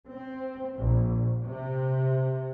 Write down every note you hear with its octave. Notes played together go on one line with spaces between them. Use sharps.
C4
A#1
C3